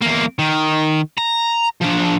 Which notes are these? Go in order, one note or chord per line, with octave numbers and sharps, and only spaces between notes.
E2 A#3
D#3
A#5
F3 D4